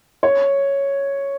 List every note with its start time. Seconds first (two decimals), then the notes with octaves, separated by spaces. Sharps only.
0.23 C#5